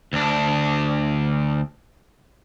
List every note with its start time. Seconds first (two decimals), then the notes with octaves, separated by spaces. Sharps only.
0.13 D2 D4